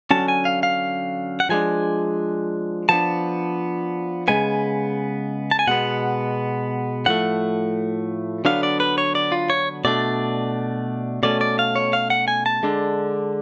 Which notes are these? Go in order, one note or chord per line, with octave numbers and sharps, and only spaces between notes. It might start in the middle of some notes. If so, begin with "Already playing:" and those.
D3 F#3 C#4 A5
G#5
F5
F5
F#5
F3 G#3 D4 G#5
F3 B3 D4 A5
C#3 G#3 B3 G#5
A5
G#5
B2 G#3 B3 F#5
A2 F3 A3 F#5
D3 F#3 B3 D4 F5
D5
B4
C#5
D5
F4
C#5
B2 A3 D4 D5
B2 A3 C#4 D5
D5
F5
C#5
F5
F#5
G#5
A5
D3 G#3 D4